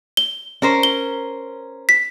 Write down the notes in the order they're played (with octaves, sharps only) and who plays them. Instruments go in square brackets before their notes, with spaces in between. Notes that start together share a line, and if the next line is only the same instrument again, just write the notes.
[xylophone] G7
[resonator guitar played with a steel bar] C#4 A#4 C5
[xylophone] G7
B6